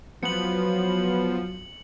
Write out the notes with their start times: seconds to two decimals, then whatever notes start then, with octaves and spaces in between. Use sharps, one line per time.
0.23 F3 F#3 B3 C#7 F#7